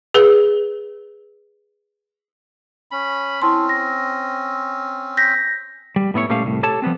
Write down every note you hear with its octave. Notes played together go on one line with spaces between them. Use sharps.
G#4 B4
C#4 B5
C4 C#4 E4 A5 C6
A#6
G6 A#6 B6
G3
A2 B3 E4 C#5
A#2 G3 A3 C#4 C5 F5
C2 A2
G4 A4 C#5 A5
F3 G3 B3 C4